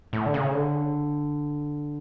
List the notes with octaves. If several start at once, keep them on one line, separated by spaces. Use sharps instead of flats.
A2
D3
C#3
D3